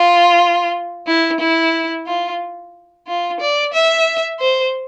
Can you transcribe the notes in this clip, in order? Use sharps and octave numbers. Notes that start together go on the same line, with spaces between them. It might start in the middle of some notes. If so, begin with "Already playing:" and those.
Already playing: F4
E4
E4
F4
F4
D5
E5
C5